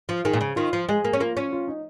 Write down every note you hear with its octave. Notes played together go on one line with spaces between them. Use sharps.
F3 F4
D#3 G#4
A#2
C#3
D#3 F4
F3
G#3 G#4
A#3
C#4
A#3 F4
C#4
F4
D#4